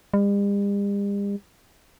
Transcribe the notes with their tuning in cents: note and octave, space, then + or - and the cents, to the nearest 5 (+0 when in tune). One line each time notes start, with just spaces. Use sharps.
G3 +45